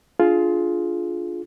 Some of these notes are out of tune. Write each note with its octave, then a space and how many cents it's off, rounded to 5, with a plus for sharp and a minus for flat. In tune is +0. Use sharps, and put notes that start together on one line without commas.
D4 +0 F4 +0 G#4 +25